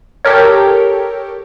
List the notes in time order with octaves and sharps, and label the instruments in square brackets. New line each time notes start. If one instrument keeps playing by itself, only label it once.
[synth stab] G4 A4 A#4 C#5